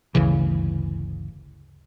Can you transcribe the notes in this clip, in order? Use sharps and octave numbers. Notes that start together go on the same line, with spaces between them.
G1 D2 C#3 E3